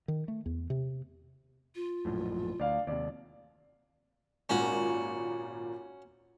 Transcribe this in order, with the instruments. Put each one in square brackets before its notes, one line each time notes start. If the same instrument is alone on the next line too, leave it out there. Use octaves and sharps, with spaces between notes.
[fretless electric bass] D#3
A3
E2
C3
[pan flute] F4
[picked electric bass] A#1 F#2 A2
[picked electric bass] D2 [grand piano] D5 F5
[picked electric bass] D#2 C3 [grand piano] D5
[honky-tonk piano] G#1 A#2 [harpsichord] C#4 F#4